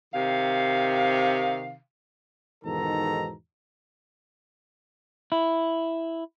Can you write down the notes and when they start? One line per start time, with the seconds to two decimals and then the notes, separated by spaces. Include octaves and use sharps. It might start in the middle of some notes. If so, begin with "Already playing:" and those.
0.14 C3 D#3 F5
2.64 E2 G#2 B2 D#3 A4 A#5
5.32 E4